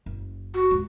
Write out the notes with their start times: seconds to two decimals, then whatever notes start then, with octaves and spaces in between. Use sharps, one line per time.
0.06 F#1
0.54 F#4
0.71 D#2 G#2